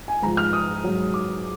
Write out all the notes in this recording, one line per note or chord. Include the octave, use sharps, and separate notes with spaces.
G#5
G#2 F3 A#5
F6
D#6
G#2 F#3
D6